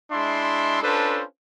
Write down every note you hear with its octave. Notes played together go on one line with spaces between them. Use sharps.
G#3 D4 E4 E5 C6
C#4 D4 F4 A4 B4 C5